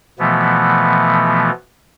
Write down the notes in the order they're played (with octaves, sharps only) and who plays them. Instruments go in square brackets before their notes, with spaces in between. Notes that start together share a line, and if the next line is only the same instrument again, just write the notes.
[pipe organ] B2 E3 F3 A3 B3